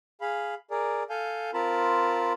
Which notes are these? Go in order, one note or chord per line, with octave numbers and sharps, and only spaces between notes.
G#4 F5 B5
G#4 A#4 D5
A4 F5 G#5 G6
C4 F4 A#4 A5 B5